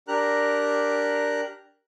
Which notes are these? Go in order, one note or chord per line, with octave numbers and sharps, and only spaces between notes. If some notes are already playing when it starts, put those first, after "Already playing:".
D4 G4 A#4 A#5 F#6